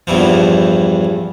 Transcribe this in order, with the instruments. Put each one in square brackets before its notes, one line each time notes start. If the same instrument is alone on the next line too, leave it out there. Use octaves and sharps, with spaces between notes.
[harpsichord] E2 G2 E3 F3